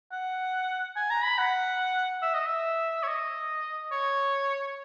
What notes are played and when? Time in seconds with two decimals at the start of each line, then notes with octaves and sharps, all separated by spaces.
0.12 F#5
0.96 G#5
1.10 A#5
1.24 B5
1.38 F#5
2.22 E5
2.34 D#5
2.46 E5
3.03 C#5
3.07 D#5
3.92 C#5